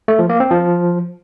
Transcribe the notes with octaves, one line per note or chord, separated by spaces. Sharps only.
A3
F3
A#3
C4
F3